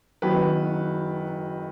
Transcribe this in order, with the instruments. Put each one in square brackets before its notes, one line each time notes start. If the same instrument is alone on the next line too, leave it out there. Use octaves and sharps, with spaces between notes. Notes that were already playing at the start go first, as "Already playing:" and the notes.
[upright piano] F#1 F#2 D#3 F#3 B3 B4